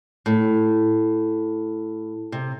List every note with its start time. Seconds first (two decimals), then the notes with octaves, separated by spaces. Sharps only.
0.26 A2
2.32 C3